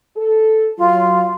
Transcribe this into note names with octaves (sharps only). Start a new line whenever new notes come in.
A4
F#3 F4